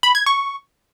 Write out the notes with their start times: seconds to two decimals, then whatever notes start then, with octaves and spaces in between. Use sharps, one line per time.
0.03 B5
0.15 G#6
0.26 C#6